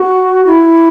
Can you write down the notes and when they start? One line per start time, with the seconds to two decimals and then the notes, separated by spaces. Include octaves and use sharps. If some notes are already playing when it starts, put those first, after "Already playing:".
Already playing: F#4
0.46 E4